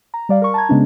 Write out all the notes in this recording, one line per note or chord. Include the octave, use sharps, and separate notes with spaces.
A#5
G3 D5 F5
A#4 C#6
A5 A#5 G#6
C#3 G#3 B3 C#4 D4